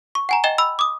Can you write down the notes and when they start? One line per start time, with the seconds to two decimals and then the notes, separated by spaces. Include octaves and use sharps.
0.15 C#6
0.29 F#5 G#5 A#5
0.44 D#5 G5 A6 E7 G7
0.58 B5 E6
0.79 D6 D#6